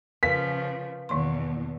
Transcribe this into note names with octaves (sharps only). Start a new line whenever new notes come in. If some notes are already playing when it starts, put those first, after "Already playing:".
C#3 F3 A#4 B4 F5 B6
E2 B2 D#3 C6